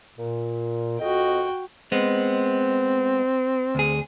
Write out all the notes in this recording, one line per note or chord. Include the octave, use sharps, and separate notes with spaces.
A#2
F2 F#4 D#5 G5
G#3 B3 C4
D2 G#4